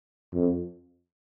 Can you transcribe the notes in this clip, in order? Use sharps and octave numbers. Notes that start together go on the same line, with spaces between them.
F2